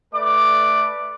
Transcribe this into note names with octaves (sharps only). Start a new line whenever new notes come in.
A3 B4 D5 D6